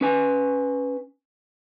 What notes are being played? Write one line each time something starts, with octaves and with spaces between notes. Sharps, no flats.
C#4 B4 G#5